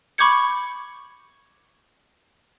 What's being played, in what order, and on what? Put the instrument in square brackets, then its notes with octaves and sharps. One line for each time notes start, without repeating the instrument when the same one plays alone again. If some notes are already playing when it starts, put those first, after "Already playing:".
[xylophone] B5 C#6 D6 G6 G#6 C#7